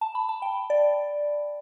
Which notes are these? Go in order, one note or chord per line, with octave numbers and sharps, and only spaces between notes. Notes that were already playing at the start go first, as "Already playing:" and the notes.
A5
B5
A5
G5
D5